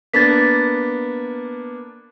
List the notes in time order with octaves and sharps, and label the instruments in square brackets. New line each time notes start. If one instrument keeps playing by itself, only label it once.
[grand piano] A#3 B3 D4 [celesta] A6 B6